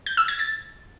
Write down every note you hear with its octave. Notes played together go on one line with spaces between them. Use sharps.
G6
E6
G#6
A6